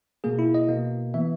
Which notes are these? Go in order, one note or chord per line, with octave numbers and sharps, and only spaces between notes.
B2 A#3 G#4
E4
D#5
B2 A#3
E3 B3 E5